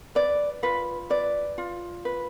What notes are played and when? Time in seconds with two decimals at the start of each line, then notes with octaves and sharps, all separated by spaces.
0.15 B4 D5
0.63 F4 B4
1.10 B4 D5
1.58 F4
2.05 B4